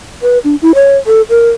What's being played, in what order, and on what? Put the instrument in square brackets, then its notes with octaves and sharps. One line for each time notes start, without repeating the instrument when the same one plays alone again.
[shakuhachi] B4
D4
E4
C#5
A4
A#4